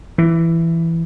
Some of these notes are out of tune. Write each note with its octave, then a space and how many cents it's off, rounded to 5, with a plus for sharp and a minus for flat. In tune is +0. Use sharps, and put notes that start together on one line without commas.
E3 +10